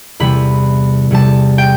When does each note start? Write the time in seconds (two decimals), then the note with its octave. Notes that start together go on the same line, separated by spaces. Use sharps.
0.20 E2 C3 G3 B5
1.11 E2 C3 G3 A5
1.58 G5